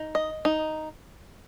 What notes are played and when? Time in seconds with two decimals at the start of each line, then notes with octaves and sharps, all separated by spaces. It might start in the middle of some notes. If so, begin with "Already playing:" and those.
Already playing: D#4
0.15 D#5
0.45 D#4